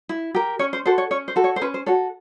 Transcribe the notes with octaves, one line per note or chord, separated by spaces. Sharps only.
E4
G4 A#4
C#4 C#5
C5
F#4 A4 C5
C#5
C#4 C#5
C5
F#4 A4
C#5
C5
C#4 B4
C5
F#4 A4 C#5